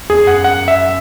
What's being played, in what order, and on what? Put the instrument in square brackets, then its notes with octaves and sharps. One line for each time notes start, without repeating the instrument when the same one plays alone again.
[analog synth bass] E2 [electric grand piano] G#4
[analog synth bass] F#2 [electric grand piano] F#5
[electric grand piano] F#5
E5